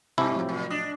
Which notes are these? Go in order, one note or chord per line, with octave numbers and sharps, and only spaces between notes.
G2 C3 E4 G#5 A5 D6
A2 F3 F#3
A#2
D4 D#5